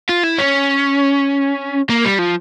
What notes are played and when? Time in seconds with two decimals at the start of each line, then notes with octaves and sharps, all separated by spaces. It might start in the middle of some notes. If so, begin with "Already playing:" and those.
0.09 F4
0.23 E4
0.38 C#4
1.90 A#3
2.05 G3
2.19 F3